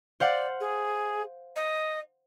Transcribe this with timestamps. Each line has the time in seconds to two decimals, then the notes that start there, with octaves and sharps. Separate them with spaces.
0.20 C5 D5 F5 F#5
0.60 G#4
1.55 D#5